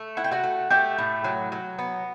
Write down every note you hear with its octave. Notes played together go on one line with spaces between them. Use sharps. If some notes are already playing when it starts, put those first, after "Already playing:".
Already playing: A3
E4 F#5
G5
F#4 F#5
A3
A3 G4 G5
A2
F#3
F#3
B3